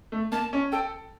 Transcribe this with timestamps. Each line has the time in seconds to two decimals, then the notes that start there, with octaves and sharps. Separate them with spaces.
0.12 A3
0.32 A#3 A5
0.53 C#4
0.72 A4 G5